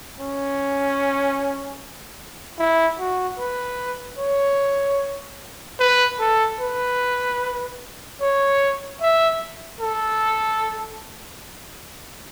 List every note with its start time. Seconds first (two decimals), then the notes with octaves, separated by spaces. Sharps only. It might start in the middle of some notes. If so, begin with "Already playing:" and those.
0.19 C#4
2.59 E4
2.99 F#4
3.39 B4
4.19 C#5
5.80 B4
6.20 A4
6.60 B4
8.21 C#5
9.01 E5
9.81 A4